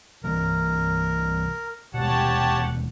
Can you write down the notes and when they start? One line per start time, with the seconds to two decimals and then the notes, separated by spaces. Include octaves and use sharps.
0.24 C2 C3 E3 A#4
1.94 D#1 B2 G4 C#5 F#5 A5